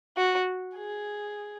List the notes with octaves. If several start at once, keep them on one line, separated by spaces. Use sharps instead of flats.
F#4
G#4